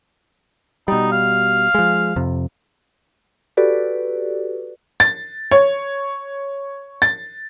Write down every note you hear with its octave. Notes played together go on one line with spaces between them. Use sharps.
B2 G3 D#4
F5
F3 G#3
F2 C3
F#4 G4 A4 B4 D5
A6
C#5
A6